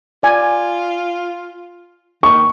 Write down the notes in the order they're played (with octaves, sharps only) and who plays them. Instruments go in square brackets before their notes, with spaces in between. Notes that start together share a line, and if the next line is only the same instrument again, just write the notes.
[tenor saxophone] F4 [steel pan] D5 G#5
[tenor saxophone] D#3 [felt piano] C#6